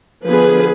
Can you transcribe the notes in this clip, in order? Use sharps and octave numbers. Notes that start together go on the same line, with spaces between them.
D3 F3 B3 G#4 B4